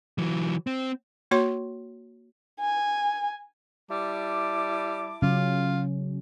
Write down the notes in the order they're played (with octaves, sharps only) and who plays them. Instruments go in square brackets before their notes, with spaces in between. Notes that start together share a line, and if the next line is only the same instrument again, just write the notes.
[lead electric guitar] E3 F#3
C4
[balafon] A#3 F#4 C#5 C6
[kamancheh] G#5
[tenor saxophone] G3 [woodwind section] E4 A5 D6
[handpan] C#3 F#3 C#4 [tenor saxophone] F4